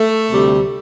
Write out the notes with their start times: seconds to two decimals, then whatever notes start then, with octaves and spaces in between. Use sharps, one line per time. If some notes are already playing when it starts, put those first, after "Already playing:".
Already playing: A3
0.30 D2 C3 G3